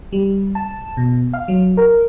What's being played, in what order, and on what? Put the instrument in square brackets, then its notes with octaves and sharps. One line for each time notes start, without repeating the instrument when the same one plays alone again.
[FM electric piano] G3
A5
B2
F5
F#3
A#4